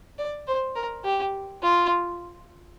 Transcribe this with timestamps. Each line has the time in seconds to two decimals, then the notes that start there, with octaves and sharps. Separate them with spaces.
0.19 D5
0.47 C5
0.76 A#4
1.04 G4
1.62 F4